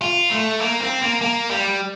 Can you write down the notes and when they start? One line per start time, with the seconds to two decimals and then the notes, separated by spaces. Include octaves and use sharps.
0.02 F4
0.31 A3
0.61 A#3
0.80 C4
1.01 A#3
1.22 A#3
1.51 G3